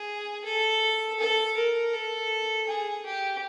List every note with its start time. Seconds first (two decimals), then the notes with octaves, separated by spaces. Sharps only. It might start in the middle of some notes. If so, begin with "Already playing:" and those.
Already playing: G#4
0.45 A4
1.20 A4
1.57 A#4
1.93 A4
2.68 G#4
3.05 G4